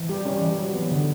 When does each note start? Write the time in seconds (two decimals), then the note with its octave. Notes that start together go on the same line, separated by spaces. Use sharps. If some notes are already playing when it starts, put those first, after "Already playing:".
Already playing: E3
0.09 G3 G4
0.25 G3 C#4 G4
0.42 E3
0.59 F#3
0.75 B3
0.91 D3